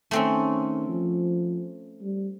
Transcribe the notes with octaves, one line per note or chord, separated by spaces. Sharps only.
D#3 A3 C4 C#4
F3
G3